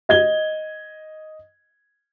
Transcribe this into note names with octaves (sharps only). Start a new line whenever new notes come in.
D#5 G#6 G7